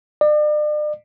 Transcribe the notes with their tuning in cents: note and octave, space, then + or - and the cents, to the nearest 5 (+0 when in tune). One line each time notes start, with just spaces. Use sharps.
D5 +40